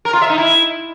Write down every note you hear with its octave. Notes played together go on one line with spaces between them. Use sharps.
A#4
F4
E5
D#4
E4